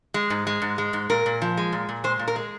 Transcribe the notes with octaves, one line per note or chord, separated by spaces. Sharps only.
G#3
G#2
G#3
G#2
G#3
G#2
A#2 A#4
A#2
F3
G#3
A#2
A#2
G#3 C5
A#2
A#4
G#3